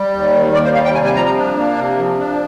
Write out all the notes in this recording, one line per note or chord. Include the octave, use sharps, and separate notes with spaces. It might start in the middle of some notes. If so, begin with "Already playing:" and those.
Already playing: G3
D#2
D#3
D#2 D5
C5
G3 F5
G5
C3 G#5
G#5
F3 A#5
A#5
D4
A#3
C3
F3
D4